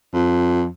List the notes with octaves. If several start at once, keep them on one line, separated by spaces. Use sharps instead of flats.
F2